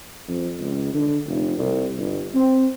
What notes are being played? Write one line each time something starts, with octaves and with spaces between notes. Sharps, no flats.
F2
C#2
D3
F1
C2
G1
C4